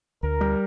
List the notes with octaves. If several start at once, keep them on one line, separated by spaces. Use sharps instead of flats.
D2 A#4
G3